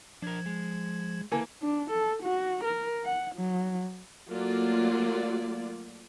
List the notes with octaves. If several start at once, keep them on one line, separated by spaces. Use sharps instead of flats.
F3 D4 A#4 G#6
G#3
E3 A#3 A4 G#5
D4
A4
F#4
A#4
F#5
F#3
F#3 A3 A#3 F4 D5